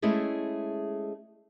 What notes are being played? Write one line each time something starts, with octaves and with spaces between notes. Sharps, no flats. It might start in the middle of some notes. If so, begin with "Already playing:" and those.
G#3 A3 C#4 E4 G#4 A4